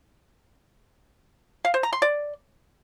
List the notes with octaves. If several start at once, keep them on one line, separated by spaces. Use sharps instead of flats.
F5
C5
A#5
C6
D5